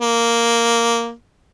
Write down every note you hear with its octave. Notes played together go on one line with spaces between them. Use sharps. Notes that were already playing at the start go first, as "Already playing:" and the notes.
A#3